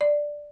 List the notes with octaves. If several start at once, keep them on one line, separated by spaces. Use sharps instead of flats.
D5